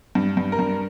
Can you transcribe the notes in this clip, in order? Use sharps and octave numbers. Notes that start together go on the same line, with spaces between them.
G2
G2
A#4
G2